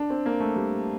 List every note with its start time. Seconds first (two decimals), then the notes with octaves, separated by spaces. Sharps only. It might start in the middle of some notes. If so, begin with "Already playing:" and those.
Already playing: D4
0.10 C4
0.26 A#3
0.40 A3
0.56 G3